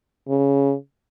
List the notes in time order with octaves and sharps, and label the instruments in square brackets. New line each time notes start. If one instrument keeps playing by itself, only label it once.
[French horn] C#3